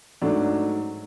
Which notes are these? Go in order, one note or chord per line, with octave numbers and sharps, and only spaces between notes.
G#2 F#3 A3 D4